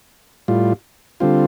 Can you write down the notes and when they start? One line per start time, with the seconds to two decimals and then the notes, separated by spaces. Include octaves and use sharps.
0.48 A2 G3 F4
1.20 D3 G3 C4 F4